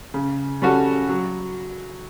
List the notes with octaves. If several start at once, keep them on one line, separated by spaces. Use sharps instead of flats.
C#3
G3 C#4 F#4 A4
F#3